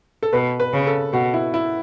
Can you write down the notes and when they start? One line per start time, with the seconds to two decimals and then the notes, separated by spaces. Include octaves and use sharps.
0.23 A4
0.33 B2 B4
0.60 B4
0.73 C#3
0.87 A4
1.13 B2 F#4
1.34 E4
1.54 E4